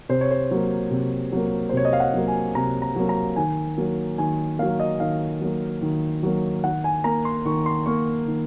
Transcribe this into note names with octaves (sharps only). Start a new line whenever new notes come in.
C3 C5
C#5
C5
F#3 A#3
C3
F#3 A#3
C5
C3 C#5
D#5
F5
F#5
F#3 A#3
G#5
C3 A#5
A#5
F#3 A#3
A#5
D#3 G#5
F#3 A#3
D#3 G#5
F#3 A#3 F5
D#5
D#3 F5
F#3 A#3
D#3
F#3 A#3
D#3 F#5
G#5
A#3 A#5
C6
D#3 C#6
C6
A#3 C#6
D#3